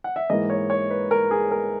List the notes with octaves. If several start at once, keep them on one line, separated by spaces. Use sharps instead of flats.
F#5
E5
G#2 E3 A#3 D#5
C#5
C#5
B4
A#4
G#4
A#4